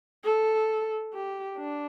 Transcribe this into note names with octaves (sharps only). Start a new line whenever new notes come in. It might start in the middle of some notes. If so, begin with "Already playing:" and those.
A4
G4
D4